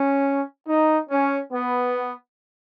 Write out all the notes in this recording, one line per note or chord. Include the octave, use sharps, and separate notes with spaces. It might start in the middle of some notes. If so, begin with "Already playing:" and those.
Already playing: C#4
D#4
C#4
B3